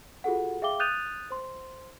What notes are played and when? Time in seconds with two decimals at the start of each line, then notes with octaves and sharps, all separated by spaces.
0.24 F4 F#4 G#4 A4 F#5
0.62 G#4 E5 F5 G5 D6 G7
0.80 D#6 F#6 G6 A6 D#7 F7
1.31 C5 C6